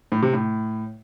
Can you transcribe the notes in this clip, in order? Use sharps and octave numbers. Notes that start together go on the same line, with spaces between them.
A2
C3
A2